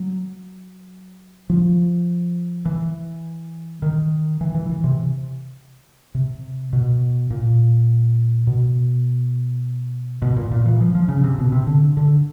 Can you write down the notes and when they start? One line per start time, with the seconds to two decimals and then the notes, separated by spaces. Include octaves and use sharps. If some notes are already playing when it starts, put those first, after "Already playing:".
Already playing: F#3
1.49 F3
2.65 E3
3.82 D#3
4.41 E3
4.55 E3
4.69 E3
4.84 C3
6.15 C3
6.73 B2
7.30 A#2
8.47 B2
10.22 B2
10.37 A#2
10.51 A#2
10.66 E3
10.81 F3
10.95 F3
11.08 C#3
11.24 C3
11.38 B2
11.52 C3
11.67 D3
11.97 D3